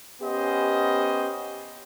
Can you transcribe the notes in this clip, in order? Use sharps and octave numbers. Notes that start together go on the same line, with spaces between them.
B3 C#4 G4 C5 D#5